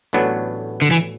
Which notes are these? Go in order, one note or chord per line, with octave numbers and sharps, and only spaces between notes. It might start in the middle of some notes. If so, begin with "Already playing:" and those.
A1 A2 F#3 B3 D4
D3
E3